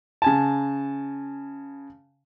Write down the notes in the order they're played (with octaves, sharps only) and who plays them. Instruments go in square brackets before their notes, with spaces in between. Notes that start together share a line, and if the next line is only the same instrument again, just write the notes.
[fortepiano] C#3 G#5 A5